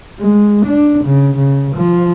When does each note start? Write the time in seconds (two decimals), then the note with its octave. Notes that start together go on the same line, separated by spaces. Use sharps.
0.20 G#3
0.66 D4
1.05 C#3
1.38 C#3
1.76 F3